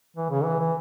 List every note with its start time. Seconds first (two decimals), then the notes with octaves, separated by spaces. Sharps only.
0.16 E3
0.30 C#3
0.45 E3
0.59 E3